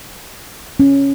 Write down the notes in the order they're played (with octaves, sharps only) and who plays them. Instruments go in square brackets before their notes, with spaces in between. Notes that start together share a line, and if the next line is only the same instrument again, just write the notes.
[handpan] C#4